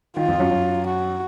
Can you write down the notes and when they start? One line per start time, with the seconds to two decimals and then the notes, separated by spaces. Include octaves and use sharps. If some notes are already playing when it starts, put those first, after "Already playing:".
0.17 D#3 F4
0.28 F2 F3
0.39 F#2 F#3
0.50 F#2 F#3
0.86 F#4